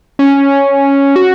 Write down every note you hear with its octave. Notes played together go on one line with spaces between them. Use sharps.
C#4
F#4